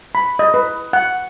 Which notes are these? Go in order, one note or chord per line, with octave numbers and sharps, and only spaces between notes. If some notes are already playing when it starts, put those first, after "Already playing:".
B5
D#5
B4
F#5